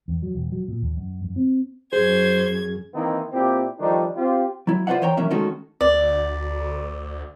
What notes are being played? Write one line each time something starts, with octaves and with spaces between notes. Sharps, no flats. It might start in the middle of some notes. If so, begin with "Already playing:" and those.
E2
F#3
E1
F#3
A#2
D#2
F#2
F#2
C4
F#2 G#4 C5 G#6
D#3 E3 A#3 C4 D#4 E4
A#2 C4 E4 G4
D#3 F3 G3 A3 D4 D#4
C4 F4 G4
F#3 E4
F4 B4 C5 D5 E5 F#5
E3 C5 C#5 G5 A#5
B1 E3 F#3 A#3 C#4 E5
D#3 G#3 A3 C#4 F#4 A4
D2 D5